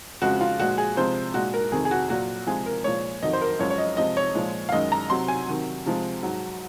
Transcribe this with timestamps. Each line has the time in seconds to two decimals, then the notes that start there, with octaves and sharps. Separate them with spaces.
0.21 F2 C#3 F3 G#3 F#4
0.41 F4
0.60 A#2 F3 G#3 F#4
0.78 G#4
0.97 C3 F3 G#3 C5
1.34 A#2 G#3 F#4
1.54 A#4
1.72 F2 C3 D#3 G#4
1.85 G#4
1.91 F#4
2.10 A#2 F#3 F#4
2.47 C3 F3 G#3 G#4
2.66 A#4
2.84 A#2 F3 G#3 C#5
3.22 F2 D#3 F#3 D#5
3.33 C5
3.41 A#4
3.59 F#2 F3 G#3 C#5
3.70 C#5
3.78 D#5
3.97 C3 F3 G#3 D#5
4.17 C#5
4.35 A#2 F3 G#3
4.69 F5
4.72 F#2 D#3 G#3 D#5
4.92 A#5
5.10 C3 F#3 C6
5.28 G#5
5.47 C3 D#3 F#3
5.86 C3 F3 G#3
6.22 G#2 F#3